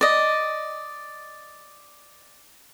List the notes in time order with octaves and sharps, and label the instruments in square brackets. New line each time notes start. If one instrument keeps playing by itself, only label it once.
[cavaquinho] D5 D#5